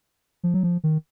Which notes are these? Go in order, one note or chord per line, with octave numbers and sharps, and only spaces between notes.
F3
F#3
F3
D#3